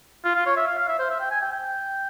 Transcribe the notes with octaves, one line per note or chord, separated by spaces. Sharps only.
F4
F4
C#5
E5
F5
F5
E5
C5
E5
G5
G#5
G5
G5